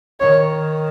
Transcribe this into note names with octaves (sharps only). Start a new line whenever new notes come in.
D#3 C#5